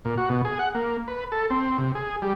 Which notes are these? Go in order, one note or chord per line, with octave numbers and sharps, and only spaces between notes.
A#2
F#4
B2
G#4
F#5
A#3
B4
A4
C4
C3
G#4
G3